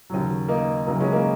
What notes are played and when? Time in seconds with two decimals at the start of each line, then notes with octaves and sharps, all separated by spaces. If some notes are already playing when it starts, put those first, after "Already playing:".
0.10 D#2 C#3 F#3
0.48 A#3 D#4
0.87 F#1 F#2 C#3 F#3 A#3
1.00 G#3 C#4
1.12 A#3 D#4